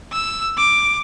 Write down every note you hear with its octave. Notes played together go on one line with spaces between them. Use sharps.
E6
D6